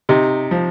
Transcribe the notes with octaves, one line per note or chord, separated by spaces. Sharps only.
C3 D#4
F3